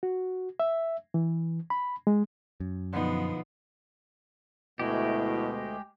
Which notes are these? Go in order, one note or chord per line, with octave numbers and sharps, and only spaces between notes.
F#4
E5
E3
B5
G#3
F#2
B2 D3 F3 B3 D#4
D2 B2 G#3 A3 E4 G4 D#5